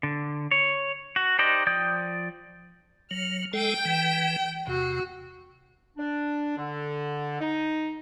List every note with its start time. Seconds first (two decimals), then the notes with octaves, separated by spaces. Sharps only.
0.03 D3
0.51 C#5
1.16 F#4
1.39 D#4 G4 C5 D5 D#5
1.67 F3 D5 G5 D#6 G6
3.11 F#3 F6
3.53 G#3 A4 G5
3.85 E3
4.67 E2 C3 F#4
5.98 D4
6.57 D3
7.40 D#4